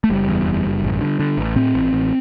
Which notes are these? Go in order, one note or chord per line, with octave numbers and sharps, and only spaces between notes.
A3
F#1 G3
E2
F#1
F#1
A1
D3
D3
A1
A2 C4
A1
A1